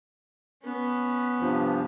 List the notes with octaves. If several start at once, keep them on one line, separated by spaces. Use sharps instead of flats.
B3 C#4
G2 C3 F3